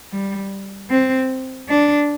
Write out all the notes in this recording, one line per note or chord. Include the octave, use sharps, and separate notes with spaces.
G3
C4
D4